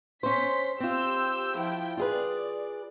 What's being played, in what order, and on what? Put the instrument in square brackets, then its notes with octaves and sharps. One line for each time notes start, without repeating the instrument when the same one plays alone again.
[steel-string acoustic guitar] C#4 C5 [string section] C6 B6
[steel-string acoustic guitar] C4 F4 [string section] G4 E6 G6
[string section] F3 E4 G5
[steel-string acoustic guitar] F4 G#4 B4 [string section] D5